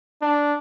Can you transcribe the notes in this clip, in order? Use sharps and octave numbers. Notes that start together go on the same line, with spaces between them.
D4